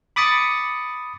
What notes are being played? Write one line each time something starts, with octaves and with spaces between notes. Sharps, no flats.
B5 D6 D#6 A6 C#7